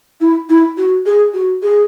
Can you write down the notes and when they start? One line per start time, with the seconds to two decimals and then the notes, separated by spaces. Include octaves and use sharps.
0.20 E4
0.49 E4
0.77 F#4
1.05 G#4
1.33 F#4
1.62 G#4